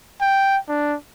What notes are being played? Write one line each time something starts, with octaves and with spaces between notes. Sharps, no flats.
G5
D4